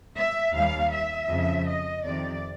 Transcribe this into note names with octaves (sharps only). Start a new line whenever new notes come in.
E5
D#2 D#3 G3 F5
E5
F2 C#3 F3
D#5
F2 C3 D#3 D5